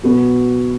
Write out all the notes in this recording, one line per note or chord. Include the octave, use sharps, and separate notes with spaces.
B2 F#3 B3 F#4